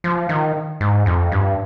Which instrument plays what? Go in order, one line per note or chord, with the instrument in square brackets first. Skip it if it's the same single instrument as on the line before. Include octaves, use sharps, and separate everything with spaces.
[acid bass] F3
D#3
G#2
F2
G2